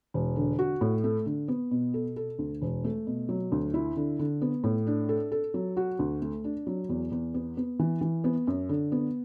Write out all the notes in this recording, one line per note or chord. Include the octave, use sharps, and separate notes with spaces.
E1
D3
F#4
A2
A3
D3
B3
B2
A4
A4
D2
E1
A3
B2
F#3
D2
E4
D3
D3
B3
A2
D4
A4
A4
F#3
F#4
D2
A3
D4
F#3
E2
E2
B3
B3
E3
E3
B3
F#2
D3
B3